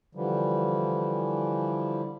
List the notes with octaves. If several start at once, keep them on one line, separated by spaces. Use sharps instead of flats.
D3 E3 F3 G3